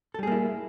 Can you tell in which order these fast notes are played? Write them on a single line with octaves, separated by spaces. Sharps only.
A4 G3 G#4 A#3 E4